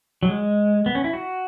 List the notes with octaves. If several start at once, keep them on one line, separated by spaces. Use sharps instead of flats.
F#3
G#3
B3
C#4
E4
F#4